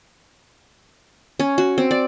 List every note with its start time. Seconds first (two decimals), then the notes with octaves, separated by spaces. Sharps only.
1.40 C#4
1.58 F#4
1.78 C4
1.91 D5